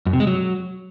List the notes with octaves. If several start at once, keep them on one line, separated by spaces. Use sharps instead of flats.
F#2
C3
G#3
F#3